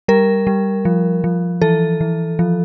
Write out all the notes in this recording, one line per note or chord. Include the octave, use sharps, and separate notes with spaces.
G3 A#4
G3
F3
F3
E3 A4
E3
F3